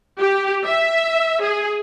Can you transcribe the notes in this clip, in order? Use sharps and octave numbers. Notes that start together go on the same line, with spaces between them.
G4
E5
G#4